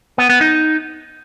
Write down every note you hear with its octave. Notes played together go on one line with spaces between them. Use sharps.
B3
B3
D#4